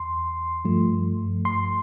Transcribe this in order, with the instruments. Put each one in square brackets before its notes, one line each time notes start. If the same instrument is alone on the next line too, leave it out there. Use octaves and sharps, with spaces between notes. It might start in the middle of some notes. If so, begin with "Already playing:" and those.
Already playing: [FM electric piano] E2 C6
G2 F3 A3
C6